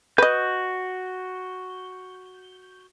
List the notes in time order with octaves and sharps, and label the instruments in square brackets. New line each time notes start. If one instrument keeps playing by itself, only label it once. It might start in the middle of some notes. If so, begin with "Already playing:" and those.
[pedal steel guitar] F#4 G6 [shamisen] B4 D#5